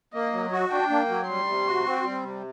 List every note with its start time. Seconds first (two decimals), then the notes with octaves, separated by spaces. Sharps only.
0.14 A#3 D#5
0.33 F#3
0.52 F#4
0.70 D4 G5
0.90 A#3
1.09 F#3
1.28 G3 C6
1.47 C3
1.66 F#4
1.86 C4
2.04 G3
2.23 C3